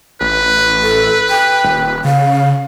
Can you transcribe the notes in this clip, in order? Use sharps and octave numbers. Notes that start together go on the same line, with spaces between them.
A1 B4
A4
G5
D#1
C#3 F5